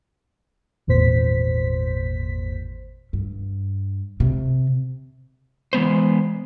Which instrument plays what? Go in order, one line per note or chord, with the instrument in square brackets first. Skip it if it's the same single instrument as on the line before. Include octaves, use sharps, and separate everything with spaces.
[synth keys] G#1 E2 A#2 C5 B6
[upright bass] G2
C3
[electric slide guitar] E3 G#3 B3 C5